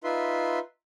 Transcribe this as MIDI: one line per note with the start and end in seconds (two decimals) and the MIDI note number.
0.04 0.59 63
0.04 0.59 65
0.04 0.59 71
0.04 0.59 76
0.04 0.59 84